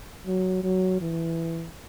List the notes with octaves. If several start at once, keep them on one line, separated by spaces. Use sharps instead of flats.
F#3
F#3
E3